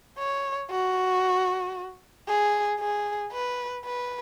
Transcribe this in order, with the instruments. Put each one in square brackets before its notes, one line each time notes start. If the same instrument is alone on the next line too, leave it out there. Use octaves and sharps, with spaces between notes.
[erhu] C#5
F#4
G#4
G#4
B4
B4